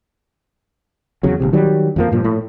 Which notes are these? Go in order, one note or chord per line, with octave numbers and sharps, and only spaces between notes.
E2 C#3 F#3
D#1 B1 C3
D#3 F#3 G3
F2 F3 A#3
G2 A#2 F3
A2